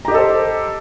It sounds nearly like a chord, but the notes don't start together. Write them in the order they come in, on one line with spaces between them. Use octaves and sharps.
A#5 G4 D#5 A4 C5